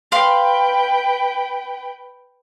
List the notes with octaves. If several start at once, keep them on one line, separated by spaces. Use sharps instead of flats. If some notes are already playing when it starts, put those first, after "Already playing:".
B4 F5 G5 B5 C6